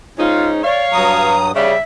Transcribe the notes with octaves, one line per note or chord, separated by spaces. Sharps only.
G#2 C#4 D#4 F4
C#5 D5 F5
G2 F#3 A#5 D#6
C#3 G3 E5